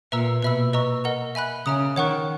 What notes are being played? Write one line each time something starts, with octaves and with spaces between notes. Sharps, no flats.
A#2 B4 E5 A#5 E6
B2 B4 E5 B5 E6
B4 D#5 A#5 C#6 E6
A#4 D#5 F#5 A#5
E5 G#5 B5 F#6
C#3 E5 A#5 D#6
D#3 C#5 F#5 C#6 F#6